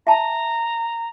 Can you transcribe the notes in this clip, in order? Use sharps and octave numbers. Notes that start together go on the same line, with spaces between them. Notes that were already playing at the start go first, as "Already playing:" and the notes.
E5 A5 A#5